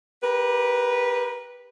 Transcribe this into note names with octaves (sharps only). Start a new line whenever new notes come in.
G4 A#4 B4